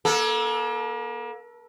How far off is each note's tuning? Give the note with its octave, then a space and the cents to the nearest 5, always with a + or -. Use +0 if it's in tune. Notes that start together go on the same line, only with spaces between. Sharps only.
A#3 +40 A4 -5